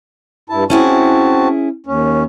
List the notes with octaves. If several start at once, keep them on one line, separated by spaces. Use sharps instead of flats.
G2 E4 A5
C4 C#4 E4 F#4 G#4 A5
D#2 C#4